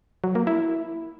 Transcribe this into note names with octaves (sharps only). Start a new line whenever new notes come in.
F#3
A#3
E4